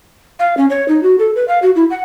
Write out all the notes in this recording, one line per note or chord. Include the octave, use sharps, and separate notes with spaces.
F5
C#4
C#5
D#4
F#4
A4
B4
F5
F#4
E4
F#5